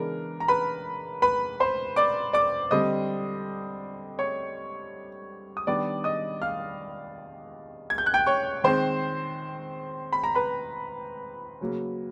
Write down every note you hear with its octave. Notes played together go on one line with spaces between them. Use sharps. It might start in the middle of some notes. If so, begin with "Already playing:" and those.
Already playing: C#3 E3 G#3 B3 D4 A#4
A#5
B4 B5
B4 B5
C5 C6
D5 D6
D5 D6
D3 G3 C4 D#5 D#6
C#5 C#6
D#6
D#3 G3 B3 D4 D5 D6
D#5 D#6
F5 F6
G#6
G6
F#6
G5 G6
C#5 C#6
D#3 G#3 C4 C5 C6
B5
A#5
B4 B5
C#3 F#3 A#3